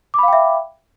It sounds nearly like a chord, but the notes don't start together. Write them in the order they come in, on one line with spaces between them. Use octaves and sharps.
D6 B5 F5 G5 E5